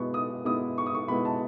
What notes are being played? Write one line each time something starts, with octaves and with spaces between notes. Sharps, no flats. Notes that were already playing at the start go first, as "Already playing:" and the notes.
Already playing: B2 G#3 B3 E4 C#6
D#6
B2 G#3 B3 E4 D#6
C#6
D#6
C#6
B2 G#3 B3 E4 B5
A5